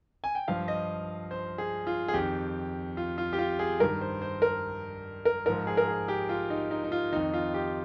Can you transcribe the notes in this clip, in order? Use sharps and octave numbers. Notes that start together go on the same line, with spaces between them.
G#5
G5
G2 F3 F5
D#5
C5
G#4
F4
G#4
F2 D#3 G4
F4
F4
G4
F4
G#4
G2 D#3 A#4
C5
C5
A#4
A#4
G#2 F3 A#4
G#4
A#4
G#4
G4
F4
D#4
D#4
D#4
F4
F2 D#3 D#4
F4
G4